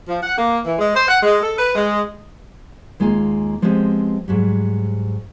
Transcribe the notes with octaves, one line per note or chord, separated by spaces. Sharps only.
F3
F#5
A#3
E3
G#3
C5
F#5
G#3
A4
B4
G#3
D#2 G#3 A#3 F4 G#5
F3 G#3 B3 C4 G4
G#2 F#3 G3